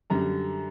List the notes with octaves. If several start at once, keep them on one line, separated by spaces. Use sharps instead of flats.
F#2 D3 G3 A#5